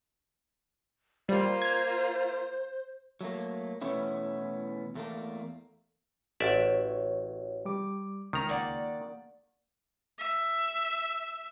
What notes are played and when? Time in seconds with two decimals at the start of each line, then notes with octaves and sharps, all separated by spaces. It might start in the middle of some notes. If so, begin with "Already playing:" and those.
1.29 G3 A#3 F4 C5
1.62 G#6
3.21 F#3 A3 A#3
3.81 B2 E3 A3 B3 C#4 E4
4.95 E2 A3 A#3
6.40 A1 F#4 C#5 D5 E5
7.65 G3 D6
8.33 C#2 D#3 A#5
8.49 A#3 D5 F#5
10.18 E5